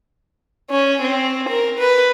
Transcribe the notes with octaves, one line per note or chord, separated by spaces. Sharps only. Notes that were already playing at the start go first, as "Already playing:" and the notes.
C#4
C4
A#4
B4